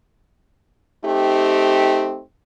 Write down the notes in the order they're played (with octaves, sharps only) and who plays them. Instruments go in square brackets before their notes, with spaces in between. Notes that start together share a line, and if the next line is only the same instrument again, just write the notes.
[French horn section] A3 C4 D#4 G4